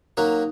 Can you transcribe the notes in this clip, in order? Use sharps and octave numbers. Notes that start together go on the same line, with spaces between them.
F#3 A#3 C#4 D#4 F#4 A#4